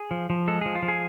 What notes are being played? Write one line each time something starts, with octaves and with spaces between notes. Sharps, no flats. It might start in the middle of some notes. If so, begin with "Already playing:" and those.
Already playing: G#4
F3
F3
G#3 A4
F3 G#4
F4
F3
G#4